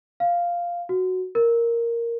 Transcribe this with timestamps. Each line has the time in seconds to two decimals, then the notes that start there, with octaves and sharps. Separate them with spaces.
0.20 F5
0.89 F#4
1.35 A#4